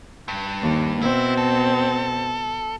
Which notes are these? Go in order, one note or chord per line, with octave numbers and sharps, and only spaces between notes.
G2
D#2
B2 C4 E4
A4